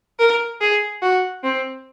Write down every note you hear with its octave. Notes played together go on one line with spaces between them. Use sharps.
A#4
G#4
F#4
C4